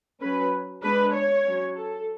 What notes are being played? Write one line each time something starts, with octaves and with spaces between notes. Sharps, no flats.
F#3 C#4 B4
G#3 B3 D4 B4
C#5
F#3 C#4
A4